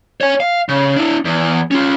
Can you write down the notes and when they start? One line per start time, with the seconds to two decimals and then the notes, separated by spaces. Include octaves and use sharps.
0.21 C#5 G#5
0.40 F5
0.69 C#3
0.96 D4 E4
1.25 E2
1.71 C#4 F4